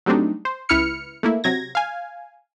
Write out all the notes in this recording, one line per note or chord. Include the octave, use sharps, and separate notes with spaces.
F#3 G3 A3 C4 D4 D#4
C5
C#2 E4 B4 F6 C#7
A3 A#3 E4
C3 F#3 G#6 A#6
F5 G#5